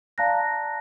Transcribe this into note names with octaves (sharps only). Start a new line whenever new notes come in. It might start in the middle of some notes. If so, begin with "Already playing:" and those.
D5 F5 A5 A#5 F#6 A#6